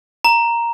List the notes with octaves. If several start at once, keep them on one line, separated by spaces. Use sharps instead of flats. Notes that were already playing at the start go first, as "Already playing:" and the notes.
A#5